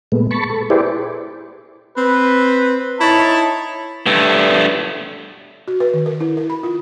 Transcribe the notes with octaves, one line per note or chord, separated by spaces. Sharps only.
A#2 G#3 A3 B3
A5 B5 C#6
A4
E4 G4 G#4 B4 C5 D5
C4 B4
D#4 E4 C#5 A5
G2 A3
F#4
B4
D#3
A#4
E4
A#4
B5
F4